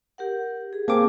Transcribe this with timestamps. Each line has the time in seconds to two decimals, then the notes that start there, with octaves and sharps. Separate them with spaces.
0.18 G4 A#4 F#5
0.73 G#4
0.88 A#3 C4 G#4 G#5 A5 D6